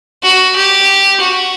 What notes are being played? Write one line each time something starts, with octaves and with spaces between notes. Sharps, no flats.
F#4
G4
F#4